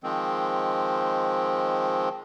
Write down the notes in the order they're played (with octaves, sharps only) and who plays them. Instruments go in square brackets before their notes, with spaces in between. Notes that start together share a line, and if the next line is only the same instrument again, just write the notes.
[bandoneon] D#3 F3 G#3 C4